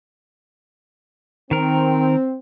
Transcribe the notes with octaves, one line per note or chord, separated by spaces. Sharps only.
D#3 C4 A#4